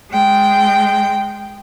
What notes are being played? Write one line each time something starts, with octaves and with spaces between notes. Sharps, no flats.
G#3 G5